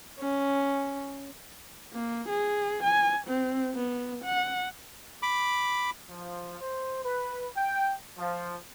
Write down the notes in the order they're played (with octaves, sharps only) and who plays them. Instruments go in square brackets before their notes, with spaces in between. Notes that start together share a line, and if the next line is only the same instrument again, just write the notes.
[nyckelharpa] C#4
[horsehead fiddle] A#3
G#4
G#5
C4
B3
F#5
[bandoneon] B5 D6
[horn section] F3
C5
B4
G5
F3